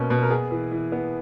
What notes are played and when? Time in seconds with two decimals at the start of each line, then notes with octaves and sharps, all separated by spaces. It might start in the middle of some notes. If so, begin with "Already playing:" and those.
Already playing: B2 A#3 C#4
0.10 B2
0.23 A#4
0.30 B3 G#4
0.51 E3
0.71 E3
0.92 B3